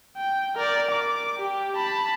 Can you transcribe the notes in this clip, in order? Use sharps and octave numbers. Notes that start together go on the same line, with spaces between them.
G5
A#4 D5
D6
G4
A5 B5